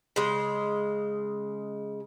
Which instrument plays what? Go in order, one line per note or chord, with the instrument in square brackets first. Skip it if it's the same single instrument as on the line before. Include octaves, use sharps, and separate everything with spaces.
[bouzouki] C#3 G#3